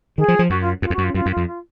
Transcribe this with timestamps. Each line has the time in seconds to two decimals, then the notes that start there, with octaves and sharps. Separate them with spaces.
0.18 D#3 G#4
0.28 F3
0.39 F3
0.50 F#2 F#4
0.61 F4
0.82 F#2 F4
0.90 F2
0.93 F#4
0.98 F#2
1.04 F4
1.14 F#2 F4
1.26 F#2
1.31 F4
1.37 F2
1.47 F4